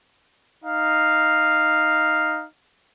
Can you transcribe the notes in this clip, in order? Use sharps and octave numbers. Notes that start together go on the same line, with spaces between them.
D#4 F5